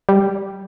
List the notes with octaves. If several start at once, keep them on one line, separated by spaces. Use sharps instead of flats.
G3